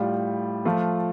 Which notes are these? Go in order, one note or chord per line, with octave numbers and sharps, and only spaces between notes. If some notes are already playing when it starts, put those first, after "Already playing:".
Already playing: A2 G3 F4
F3 A3 F4